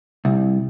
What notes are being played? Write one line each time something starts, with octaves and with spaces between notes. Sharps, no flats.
C2